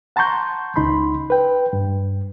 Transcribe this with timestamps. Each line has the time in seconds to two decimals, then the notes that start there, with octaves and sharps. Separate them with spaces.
0.16 F#5 A5 A#5 C6 C#6 G6
0.76 C#2 D#4 B5 C6
1.30 B4 G5
1.73 G2